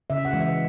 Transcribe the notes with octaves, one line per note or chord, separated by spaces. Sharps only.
C#3 E5
F#5
E3 G#3
E5